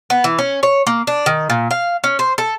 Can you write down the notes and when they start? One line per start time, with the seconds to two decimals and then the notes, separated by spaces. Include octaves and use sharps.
0.10 B3
0.24 E3
0.39 C#4
0.63 C#5
0.87 A#3
1.07 D4
1.26 D#3
1.50 A#2
1.71 F5
2.04 C#4
2.19 C5
2.38 A4